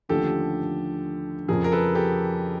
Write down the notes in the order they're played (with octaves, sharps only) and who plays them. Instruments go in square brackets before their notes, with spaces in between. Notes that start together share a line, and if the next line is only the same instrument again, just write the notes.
[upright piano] D#2 D3 F3 A3 C#4 [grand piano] G4 A4
[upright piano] F2 C#3 F3 [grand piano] G#4 A#4
[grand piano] A#4
A4 B4
G4 A4